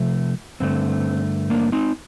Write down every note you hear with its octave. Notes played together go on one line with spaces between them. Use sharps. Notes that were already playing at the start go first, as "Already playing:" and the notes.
Already playing: C3 F3 A3
G2 D3 A3 C4
A#3 D4
C4 D#4